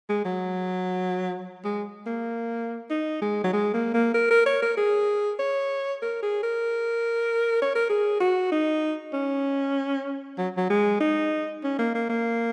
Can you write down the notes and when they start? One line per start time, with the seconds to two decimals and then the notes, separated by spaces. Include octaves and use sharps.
0.09 G#3
0.25 F#3
1.65 G#3
2.06 A#3
2.90 D#4
3.22 G#3
3.44 F#3
3.53 G#3
3.74 A#3
3.94 A#3
4.14 A#4
4.30 A#4
4.46 C#5
4.62 A#4
4.77 G#4
5.39 C#5
6.02 A#4
6.22 G#4
6.43 A#4
7.62 C#5
7.75 A#4
7.89 G#4
8.20 F#4
8.52 D#4
9.13 C#4
10.38 F#3
10.57 F#3
10.70 G#3
11.00 D#4
11.64 C#4
11.79 A#3
11.95 A#3
12.09 A#3